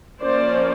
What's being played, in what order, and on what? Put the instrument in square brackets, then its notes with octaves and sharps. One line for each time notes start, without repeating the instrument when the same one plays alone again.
[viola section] F3 A#3 C#4 C5 D5